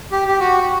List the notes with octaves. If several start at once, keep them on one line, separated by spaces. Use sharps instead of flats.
G4
G4
F#4